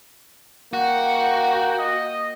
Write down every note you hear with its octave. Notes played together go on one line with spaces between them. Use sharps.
A#3 F#4 G5
D#5